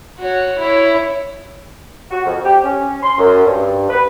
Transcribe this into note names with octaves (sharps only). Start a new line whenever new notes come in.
F#4 C#5
E4 C#5
F#4
F2
G4
C#4
C6
F#2
G2
B4